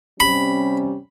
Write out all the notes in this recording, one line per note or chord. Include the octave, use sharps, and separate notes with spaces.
C3 G3 C#4 B5